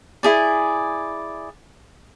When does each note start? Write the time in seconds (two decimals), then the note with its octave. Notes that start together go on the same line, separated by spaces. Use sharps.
0.23 E4 G#4 D5